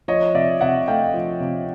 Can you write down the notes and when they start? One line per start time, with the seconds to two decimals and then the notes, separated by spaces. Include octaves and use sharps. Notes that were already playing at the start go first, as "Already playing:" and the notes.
0.08 F3 C#5 D#5
0.34 C3 D5 E5
0.61 C3 E5 F#5
0.88 A3 F5 G5
1.14 F3
1.40 C3